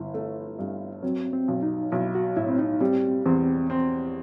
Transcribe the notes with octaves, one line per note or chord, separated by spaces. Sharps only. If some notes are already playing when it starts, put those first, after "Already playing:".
Already playing: G1 E4
A3
G2
F#3 C4
C4
B1
D#4
B1 E4
F#4
A2 E4
C4
D#4
G3 C4
E2 C4
C4